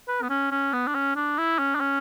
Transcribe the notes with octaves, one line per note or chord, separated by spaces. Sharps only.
B4
B3
C#4
C#4
B3
D4
C#4
D4
E4
C#4
D4
C#4